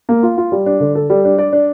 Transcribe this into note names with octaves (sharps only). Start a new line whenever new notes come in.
A#3
F4
F4
G3
D4
D3
A4
G3
D4
D5
D4